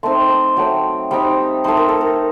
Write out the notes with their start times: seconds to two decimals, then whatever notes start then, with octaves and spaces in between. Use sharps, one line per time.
0.03 A3 C4 D#4 C6
0.29 A#5
0.57 F#3 A3 C4 G5
1.11 G3 C4 D#4 G5
1.64 A3 D#4 C5
1.77 A#4
1.88 A4
2.01 A#4